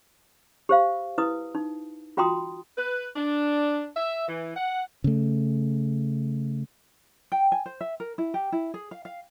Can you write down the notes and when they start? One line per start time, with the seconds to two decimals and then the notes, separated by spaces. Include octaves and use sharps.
0.69 G4 C5 F5
1.18 E4 B4 D#6
1.55 D#4
2.17 F4 F#4 G5 A#5 C6 D#6
2.78 B4
3.16 D4
3.97 E5
4.29 E3
4.56 F#5
5.04 C#3 A3
7.32 G5
7.52 G#5
7.66 C5
7.81 E5
8.00 A#4
8.18 E4
8.34 G4
8.52 E4
8.74 G#4
8.91 F5
9.05 F5